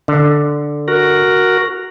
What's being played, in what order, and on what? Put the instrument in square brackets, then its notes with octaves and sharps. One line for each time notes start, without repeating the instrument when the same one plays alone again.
[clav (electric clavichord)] D3
[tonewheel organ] F#4 A#4